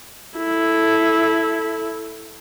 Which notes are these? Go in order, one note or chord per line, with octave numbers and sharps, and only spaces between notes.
E4 A4